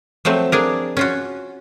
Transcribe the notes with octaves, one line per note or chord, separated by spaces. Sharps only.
F3 F#3 A3 C4
D4 G#4 A#4
C#4 F4 F#4